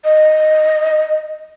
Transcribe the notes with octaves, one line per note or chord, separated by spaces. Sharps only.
D#5